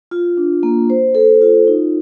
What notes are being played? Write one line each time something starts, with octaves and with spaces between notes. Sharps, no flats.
F4
D4
A#3
C5
A4
F4
D#4